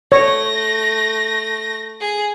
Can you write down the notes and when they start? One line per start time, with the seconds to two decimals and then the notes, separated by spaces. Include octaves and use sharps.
0.12 A3 C#5 A#6
2.00 G#4